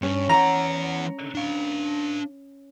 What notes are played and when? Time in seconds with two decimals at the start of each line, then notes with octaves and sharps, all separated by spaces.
0.03 G2 C#4
0.29 E3 F#5 A#5
1.35 D4 F5